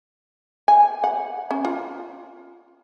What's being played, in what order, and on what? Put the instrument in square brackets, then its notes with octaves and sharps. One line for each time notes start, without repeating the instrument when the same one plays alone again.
[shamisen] G#5
F#5
C#4
F4